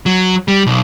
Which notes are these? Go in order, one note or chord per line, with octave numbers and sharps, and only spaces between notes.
F#3
G3
B1